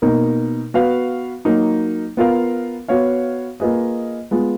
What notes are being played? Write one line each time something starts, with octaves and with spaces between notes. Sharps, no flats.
B2 A#3 D#4 A#4
B3 F#4 B4 F5
F#3 A#3 D#4
B3 F4 A#4 F5
B3 F#4 C#5 F5
A#3 F4 G#4 B4 D#5
G#3 B3 F4